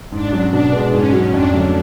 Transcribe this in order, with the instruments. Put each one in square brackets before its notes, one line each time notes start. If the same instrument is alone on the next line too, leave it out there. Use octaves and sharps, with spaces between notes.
[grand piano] G#2 [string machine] D4
[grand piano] F#3 C#4 F#4
[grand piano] B2 [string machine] D4
[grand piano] G#3 B3
[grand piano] G#2 [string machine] C#4
[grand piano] F#3 C#4 F#4
[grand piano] F2 [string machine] D4
[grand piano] D3 F#3 A3 C#4